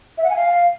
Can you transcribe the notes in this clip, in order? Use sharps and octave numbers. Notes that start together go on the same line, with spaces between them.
E5
F#5
G#5
F5